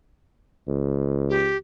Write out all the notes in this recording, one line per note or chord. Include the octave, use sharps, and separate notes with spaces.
C#2
G4